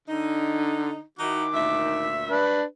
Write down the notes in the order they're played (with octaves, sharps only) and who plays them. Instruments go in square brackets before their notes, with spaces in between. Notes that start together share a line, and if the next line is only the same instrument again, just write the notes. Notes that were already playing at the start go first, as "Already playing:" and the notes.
[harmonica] D3 [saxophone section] D#4
[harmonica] D#3 D6 [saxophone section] D#4 E4 F#4
[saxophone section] D2 A#2 E5
[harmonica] D4 B4